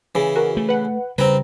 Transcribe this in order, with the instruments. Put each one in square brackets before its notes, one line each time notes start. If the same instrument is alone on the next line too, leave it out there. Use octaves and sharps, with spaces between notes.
[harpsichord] C#3 E3
[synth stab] F#4 A#4
[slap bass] A3
[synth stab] B4 F#5
[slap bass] C#3 G3 [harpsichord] C4 B4 [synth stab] A#5